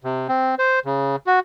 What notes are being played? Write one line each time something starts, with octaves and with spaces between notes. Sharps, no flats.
C3
C4
C5
C#3
F#4